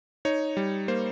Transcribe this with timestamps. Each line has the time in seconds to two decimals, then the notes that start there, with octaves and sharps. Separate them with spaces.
0.25 D#4 C#5
0.57 G3
0.88 A#3 C5